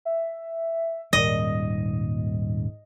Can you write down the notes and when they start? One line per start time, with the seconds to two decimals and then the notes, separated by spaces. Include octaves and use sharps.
0.05 E5
1.13 D#1 G#2 G3 D#5